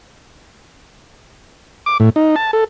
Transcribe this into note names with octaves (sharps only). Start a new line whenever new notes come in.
D6
A2
D#4
A5
A4